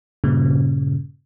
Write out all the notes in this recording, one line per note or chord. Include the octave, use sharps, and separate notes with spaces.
G2 A#2 C#3